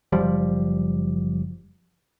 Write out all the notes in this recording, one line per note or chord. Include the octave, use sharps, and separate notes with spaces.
F#1 F3 G3